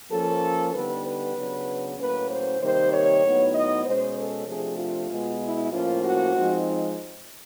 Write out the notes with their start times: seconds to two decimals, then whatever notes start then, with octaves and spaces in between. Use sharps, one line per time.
0.10 F3 A#3 C#4 A4
0.73 D3 G3 B3 D#4 B4
1.04 B4
1.35 C#3 F#3 B3 D4
1.97 A2 F#3 A#3 C#4 B4
2.28 C5
2.60 C3 D#3 G3 A#3 C5
2.90 C#5
3.22 A2 F#3 B3 D#4
3.53 D#5
3.84 B2 G#3 C#4 C5
4.15 A4
4.46 C3 F3 A3 D4 G#4
4.77 F4
5.09 B2 G#3 B3
5.40 E4
5.71 A2 F3 A#3 C#4 F4
6.02 F#4
6.34 F3 G#3 C4 D#4